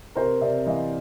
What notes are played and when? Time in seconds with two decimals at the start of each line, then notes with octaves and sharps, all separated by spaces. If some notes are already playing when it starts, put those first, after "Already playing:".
0.15 C3 A#4 C5
0.41 C3 D5 E5
0.66 E3 D#5 F5